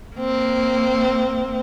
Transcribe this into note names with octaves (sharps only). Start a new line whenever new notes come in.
A#3 C4